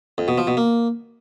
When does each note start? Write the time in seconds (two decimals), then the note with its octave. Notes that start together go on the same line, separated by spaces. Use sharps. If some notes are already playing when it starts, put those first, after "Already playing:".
0.18 F2
0.28 B2
0.38 F3
0.47 B2
0.57 A#3